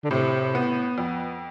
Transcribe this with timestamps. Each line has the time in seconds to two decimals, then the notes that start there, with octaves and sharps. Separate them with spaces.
0.04 D3
0.10 A2 C3
0.55 B3
0.98 F2